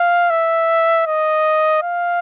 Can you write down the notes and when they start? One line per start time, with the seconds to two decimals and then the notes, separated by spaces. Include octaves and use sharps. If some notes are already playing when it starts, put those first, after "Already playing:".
Already playing: F5
0.30 E5
1.06 D#5
1.83 F5